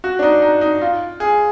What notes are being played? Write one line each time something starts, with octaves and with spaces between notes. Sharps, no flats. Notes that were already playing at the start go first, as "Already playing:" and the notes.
F#4
D4
D#4
D#4
D#4
F4
G#4